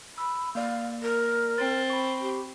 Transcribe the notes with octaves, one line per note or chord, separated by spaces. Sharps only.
B5 E6
A#3 D5 F5
A#4
C4 A6
B5 C#6
G4